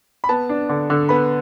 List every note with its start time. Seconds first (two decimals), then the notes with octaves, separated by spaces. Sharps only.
0.24 B5
0.29 B3 A5
0.49 D4
0.69 D3
0.90 D3
1.09 B3 B5